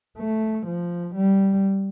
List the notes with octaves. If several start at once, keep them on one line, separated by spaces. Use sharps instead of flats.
A3
F3
G3